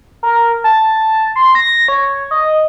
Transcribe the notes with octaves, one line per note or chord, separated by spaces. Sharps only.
A#4
A5
C6
A#6
C#5
D#5